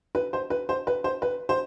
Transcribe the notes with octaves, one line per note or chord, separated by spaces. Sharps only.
B4
C5
B4
C5
B4
C5
B4
C5